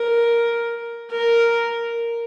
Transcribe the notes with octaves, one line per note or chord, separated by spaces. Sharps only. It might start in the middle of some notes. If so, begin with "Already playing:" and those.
Already playing: A#4
A#4